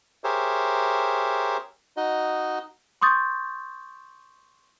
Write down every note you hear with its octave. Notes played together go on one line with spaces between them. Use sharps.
G4 G#4 A#4 C5 C#5 E5
D#4 F#4 D#5
C6 C#6 D#6 G6 A6